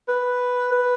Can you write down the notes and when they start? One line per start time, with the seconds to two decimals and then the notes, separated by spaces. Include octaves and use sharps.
0.08 B4
0.72 B4